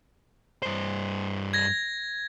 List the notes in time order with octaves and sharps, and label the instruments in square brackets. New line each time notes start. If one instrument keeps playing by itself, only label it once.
[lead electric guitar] G2 C5
[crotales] G#6 A#6